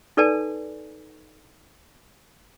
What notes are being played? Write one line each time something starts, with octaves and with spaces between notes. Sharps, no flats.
D#4 A4 B4 D5 G#5 A5